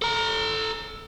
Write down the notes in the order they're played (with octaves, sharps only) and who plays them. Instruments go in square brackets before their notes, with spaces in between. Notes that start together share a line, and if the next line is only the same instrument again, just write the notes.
[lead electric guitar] A4 A#5